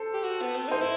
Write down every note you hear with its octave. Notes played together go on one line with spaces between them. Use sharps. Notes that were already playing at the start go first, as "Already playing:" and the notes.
Already playing: A4 C5
G4
F#4
B3
C4
D#4 C5
E4